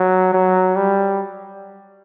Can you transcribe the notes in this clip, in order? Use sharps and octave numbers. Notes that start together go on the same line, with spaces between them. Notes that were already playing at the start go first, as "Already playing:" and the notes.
Already playing: F#3
F#3
G3